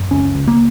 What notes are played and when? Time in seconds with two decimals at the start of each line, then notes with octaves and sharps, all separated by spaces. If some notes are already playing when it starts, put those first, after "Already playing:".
Already playing: F#2
0.11 C#2 C#4
0.35 C#2
0.48 A#3